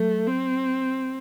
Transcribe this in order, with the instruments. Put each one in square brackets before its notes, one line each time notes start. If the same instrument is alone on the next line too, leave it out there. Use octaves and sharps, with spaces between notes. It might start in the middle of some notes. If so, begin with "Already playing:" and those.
Already playing: [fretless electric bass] F#3 [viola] A3
[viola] C4